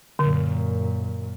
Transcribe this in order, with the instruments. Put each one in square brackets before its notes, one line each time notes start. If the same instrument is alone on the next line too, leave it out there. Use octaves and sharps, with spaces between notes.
[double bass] F#2 A#2 [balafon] D3